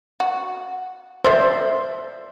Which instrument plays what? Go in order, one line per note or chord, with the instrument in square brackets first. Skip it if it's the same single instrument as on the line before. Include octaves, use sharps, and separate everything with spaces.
[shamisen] F#4
[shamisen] A4 D5 E5 [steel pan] C5